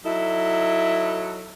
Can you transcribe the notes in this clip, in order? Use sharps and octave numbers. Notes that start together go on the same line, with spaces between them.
F#3 D#4 E4 A4